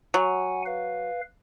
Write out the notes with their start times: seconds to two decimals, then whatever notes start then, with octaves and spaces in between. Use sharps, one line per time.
0.14 F#3 F#5 G#5
0.66 B4 F5